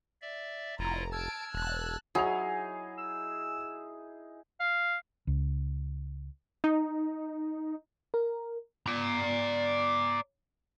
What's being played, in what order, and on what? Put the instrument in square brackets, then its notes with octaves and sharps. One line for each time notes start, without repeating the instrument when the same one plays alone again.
[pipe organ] D5 E5
[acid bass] F1 [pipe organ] E4 F4 [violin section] A#5
[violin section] A5 D7 [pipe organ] E6 F6 G#6
[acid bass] E1 [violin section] A5 F#6
[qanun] F#3 [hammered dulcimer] D#4 E4 G#4 [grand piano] G#5 F7
[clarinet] E6
F5
[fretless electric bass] C#2
[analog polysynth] D#4
[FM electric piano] A#4
[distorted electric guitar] D5 A#5